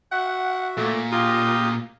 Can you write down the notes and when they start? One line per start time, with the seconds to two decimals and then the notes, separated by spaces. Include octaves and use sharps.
0.12 F#4 E5 F#5
0.77 A#2 A3
1.12 F4 G4 A#5 D#6